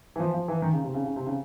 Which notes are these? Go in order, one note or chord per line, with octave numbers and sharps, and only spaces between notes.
E3
F3
F3
E3
D#3
C#3
C3
C#3
C#3
C3
C#3